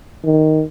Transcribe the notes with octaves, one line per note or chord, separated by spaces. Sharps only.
D#3